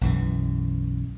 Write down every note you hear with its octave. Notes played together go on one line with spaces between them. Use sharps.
B1 F#2 E3